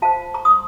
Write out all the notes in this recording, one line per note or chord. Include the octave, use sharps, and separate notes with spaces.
F4 C5 F5 A5
A#5 C#6
C6 D#6